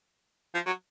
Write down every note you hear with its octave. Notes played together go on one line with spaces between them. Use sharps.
F3
F#3